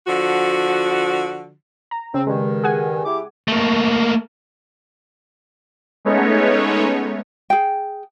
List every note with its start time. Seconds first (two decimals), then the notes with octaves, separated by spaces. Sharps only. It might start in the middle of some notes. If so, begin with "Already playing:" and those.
0.07 D3 F3 F#4
1.91 A#5
2.14 C#3 C4
2.27 G2 D#3 G#3
2.64 G#4 F#5 G#5
3.06 E4 G4 D6
3.48 A3 A#3
6.05 G#3 A3 B3 C#4 D#4 C#5
7.50 G#4 G5